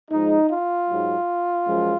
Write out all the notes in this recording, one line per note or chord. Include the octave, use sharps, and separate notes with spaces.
G#2 F3 G#3 D#4
F4
G#2 F#3
F#2 F3 G#3